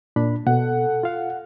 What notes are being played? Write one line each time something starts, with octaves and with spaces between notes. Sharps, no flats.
A#2 D4 B5
B2 A4 F#5
F4 F5